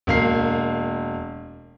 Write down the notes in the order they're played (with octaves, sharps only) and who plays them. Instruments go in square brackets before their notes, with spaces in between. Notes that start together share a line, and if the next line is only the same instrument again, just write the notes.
[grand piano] E1 A#3 C7